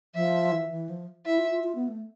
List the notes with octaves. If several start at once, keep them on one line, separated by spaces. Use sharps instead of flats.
F3 E5
E3
E3
F3
E4 E5
F4
F4
F4
B3
A3